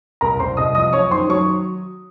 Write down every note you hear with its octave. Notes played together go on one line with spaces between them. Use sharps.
C2 A#4 A#5
C2 C5 C6
C2 D#5 D#6
F3 D#5 D#6
F#2 C#5 C#6
D#3 C5 C6
F#3 C#5 C#6